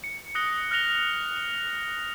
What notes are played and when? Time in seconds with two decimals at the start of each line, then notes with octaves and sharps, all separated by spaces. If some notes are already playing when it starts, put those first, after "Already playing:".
0.04 C#7
0.35 D#6 F#6 A#6 C#7 G7
0.71 F6 F#6 A#6 F7 G7
1.37 F7